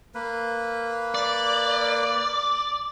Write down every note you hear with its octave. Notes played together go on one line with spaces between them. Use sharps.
A#3 B4
D5